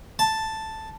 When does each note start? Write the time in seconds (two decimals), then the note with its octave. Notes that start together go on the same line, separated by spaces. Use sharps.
0.19 A5